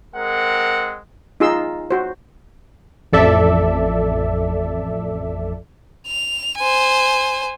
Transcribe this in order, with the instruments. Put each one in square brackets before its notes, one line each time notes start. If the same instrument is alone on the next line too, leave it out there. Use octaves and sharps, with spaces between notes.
[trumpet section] G#3 C4 A#4 F#5
[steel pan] D#4 F4 G#4 C6 E6
F#4 C5
[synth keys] A1 F2 A4 D5 E5
[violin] F7
C5 G#5